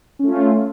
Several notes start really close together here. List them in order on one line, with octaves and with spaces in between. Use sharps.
C#4 A3 F4